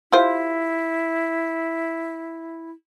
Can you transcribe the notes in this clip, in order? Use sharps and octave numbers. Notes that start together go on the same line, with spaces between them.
E4 F4 G4 C5